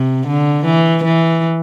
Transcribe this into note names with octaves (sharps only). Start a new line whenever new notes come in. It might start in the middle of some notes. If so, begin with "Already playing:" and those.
Already playing: C3
D3
E3
E3